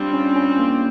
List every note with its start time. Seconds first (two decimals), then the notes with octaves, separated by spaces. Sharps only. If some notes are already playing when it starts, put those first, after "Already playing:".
Already playing: G3 C4 D4 F4
0.13 C#4
0.36 C#4
0.59 A#3